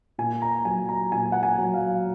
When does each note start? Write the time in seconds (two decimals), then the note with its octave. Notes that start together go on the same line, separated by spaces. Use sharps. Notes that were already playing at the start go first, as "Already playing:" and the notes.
0.18 A#2 G#5
0.42 A#5
0.65 F#3 G#5
0.89 A#5
1.12 A#2 G#5
1.32 F#5
1.43 G#5
1.58 F#3
1.74 F5